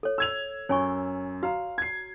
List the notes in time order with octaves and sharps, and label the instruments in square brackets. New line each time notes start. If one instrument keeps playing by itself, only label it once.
[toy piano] A4 C#5
[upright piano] E6 G#6 F7
[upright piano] F#2 [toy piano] C#5 G#5 C#6
[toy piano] F#4 A#5 [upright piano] F5
[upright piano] G#6 C7